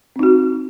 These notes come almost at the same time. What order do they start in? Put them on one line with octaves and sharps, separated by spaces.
C4 D#4 F#4